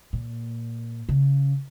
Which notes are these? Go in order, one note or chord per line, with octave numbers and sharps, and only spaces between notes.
A#2
C#3